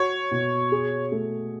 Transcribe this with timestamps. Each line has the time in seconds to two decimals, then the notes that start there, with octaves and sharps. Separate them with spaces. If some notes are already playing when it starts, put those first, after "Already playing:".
Already playing: F#4 C#5
0.31 B2
0.72 G#4
1.12 A3